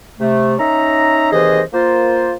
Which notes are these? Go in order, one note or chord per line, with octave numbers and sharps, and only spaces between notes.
C3 A3
C#4 D#4 E5 A#5
D#2 C3 E3 G#4 C5 D#5
A#3 F4 C5